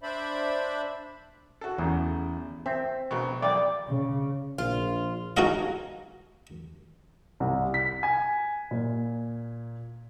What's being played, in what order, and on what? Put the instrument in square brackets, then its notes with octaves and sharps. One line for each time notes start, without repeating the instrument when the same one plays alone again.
[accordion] D4 C5 D5 E5 B5
[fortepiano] F#4 A4
[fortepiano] A1 C#3 [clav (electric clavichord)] E2
[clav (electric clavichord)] C4 [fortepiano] E5
[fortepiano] A#1 B2
[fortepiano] B1 G5 [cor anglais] D5
[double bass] C#3
[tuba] A#1 [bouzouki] F4
[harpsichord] D#4 F#4 G#4 A4 D#5 F5
[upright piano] C2
B6
G#5
A#2